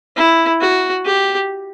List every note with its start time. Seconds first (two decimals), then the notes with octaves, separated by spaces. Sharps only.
0.17 E4
0.61 F#4
1.05 G4